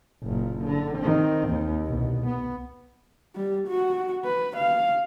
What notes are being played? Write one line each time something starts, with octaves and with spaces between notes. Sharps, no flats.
F#1 A#2
D3
D#3 C4
D#2
C2 B2
B3
G3
F#4
B4
F5